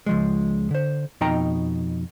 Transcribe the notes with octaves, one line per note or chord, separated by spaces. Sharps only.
C#2 F3 G#3
D3 C5
F2 B2 D#4 D#5 G5 A#5